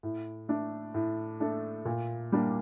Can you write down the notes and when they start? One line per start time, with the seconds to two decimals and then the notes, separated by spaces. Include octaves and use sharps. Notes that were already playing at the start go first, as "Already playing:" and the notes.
0.03 A2
0.49 A3 D4 A4
0.94 A2
1.40 A3 D4 A4
1.85 A#2
2.32 G3 A#3 D4